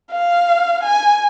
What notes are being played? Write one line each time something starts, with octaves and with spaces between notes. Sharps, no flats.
F5
G#5